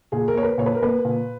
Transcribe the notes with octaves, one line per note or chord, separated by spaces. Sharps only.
A#2 G#4
A#4
A#3 C#5
B4
A#2 C#5
B4
A#4
A#3 B4
A#2